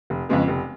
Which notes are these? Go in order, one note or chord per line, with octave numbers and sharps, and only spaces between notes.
F1
F2 C#3 G#3 B3
F1